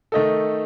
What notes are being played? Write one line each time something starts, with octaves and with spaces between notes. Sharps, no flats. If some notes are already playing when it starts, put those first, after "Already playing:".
D#3 A3 D#4 A4